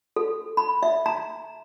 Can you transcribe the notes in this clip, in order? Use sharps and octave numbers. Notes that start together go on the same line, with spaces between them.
A4
B5
E5
A#5